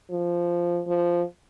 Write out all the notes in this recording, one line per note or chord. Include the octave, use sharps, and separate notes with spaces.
F3
F3